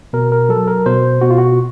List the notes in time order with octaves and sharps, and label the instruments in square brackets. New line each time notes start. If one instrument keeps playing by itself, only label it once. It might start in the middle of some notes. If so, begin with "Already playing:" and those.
[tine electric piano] B2 A#4
A#4
F#3 A4
A#4
B2 C5
B2 F#4
F4
F#4